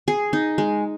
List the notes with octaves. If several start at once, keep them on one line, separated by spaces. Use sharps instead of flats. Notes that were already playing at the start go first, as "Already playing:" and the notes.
G#4
D#4
G#3